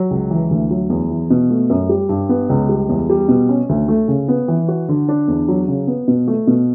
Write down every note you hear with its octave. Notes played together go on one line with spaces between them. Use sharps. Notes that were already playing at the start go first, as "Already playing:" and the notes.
Already playing: F#3
C#2
E3
D2
F#3
E2
E3
B2
A3
F#2
G3
G2
B3
C#2
G3
E2
G3
B2
C#4
D2
A3
C#3
B3
E3
F#4
D3
D4
E2
F#3
C#3
B3
B2
A3
B2